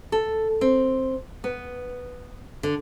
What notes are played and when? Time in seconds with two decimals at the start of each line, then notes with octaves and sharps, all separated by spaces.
0.12 A4
0.61 C4
1.44 B3
2.63 D3